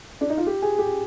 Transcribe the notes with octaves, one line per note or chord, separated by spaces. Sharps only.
D4
D#4
F4
G4
G#4
G4